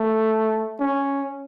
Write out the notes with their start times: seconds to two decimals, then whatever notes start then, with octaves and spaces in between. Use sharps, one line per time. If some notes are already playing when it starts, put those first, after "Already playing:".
Already playing: A3
0.80 C#4